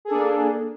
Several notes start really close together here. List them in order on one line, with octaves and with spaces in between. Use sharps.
G#4 A4 D4 A#3